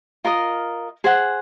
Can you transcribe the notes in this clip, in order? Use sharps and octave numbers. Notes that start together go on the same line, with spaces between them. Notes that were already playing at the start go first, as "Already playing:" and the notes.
F4 A#4 D#5
G#4 C5 F#5